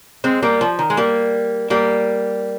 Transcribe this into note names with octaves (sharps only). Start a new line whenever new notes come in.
G#3 C4
G3 A#3
F3
D#3
G#3
G3 A#3
G3 A#3